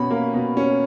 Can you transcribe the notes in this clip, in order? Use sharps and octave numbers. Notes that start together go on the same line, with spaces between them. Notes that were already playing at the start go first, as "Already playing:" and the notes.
Already playing: B2 C#4 B5
A#3
B2
C#4